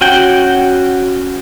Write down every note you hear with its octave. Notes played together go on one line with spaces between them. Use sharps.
C#4 F#4 G5